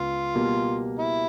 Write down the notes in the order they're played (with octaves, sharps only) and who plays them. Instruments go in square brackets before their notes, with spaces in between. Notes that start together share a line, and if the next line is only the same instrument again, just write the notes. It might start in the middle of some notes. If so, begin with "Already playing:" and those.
Already playing: [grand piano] C#2 B3 [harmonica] F4
[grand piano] B2 G3 A#3
[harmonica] E4